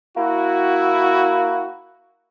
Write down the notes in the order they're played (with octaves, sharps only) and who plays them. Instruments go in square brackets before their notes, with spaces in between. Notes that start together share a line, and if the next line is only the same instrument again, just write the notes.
[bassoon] A#3 [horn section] E4 F#4